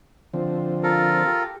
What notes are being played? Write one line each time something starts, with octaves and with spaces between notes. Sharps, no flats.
D3 F3 C4
F4 A4 A#4
G4